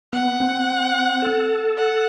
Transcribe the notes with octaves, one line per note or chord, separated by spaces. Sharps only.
B3 F#5
C4
A4
F#5